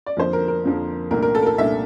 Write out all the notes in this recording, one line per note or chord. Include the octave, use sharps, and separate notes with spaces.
D5
F2 D3 F3 A#3 C5
A#4
A#4
F2 D3 F3 A#3
C2 A#2 A3 D4 A#4
A#4
A4
A#4
A4
C2 A#2 A3 D4 E5